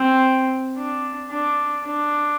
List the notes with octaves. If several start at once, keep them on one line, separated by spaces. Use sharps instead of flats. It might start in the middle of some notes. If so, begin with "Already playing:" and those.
Already playing: C4
D4
D4
D4